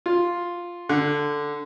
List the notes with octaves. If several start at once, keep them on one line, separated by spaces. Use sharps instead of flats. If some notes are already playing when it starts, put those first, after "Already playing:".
F4
D3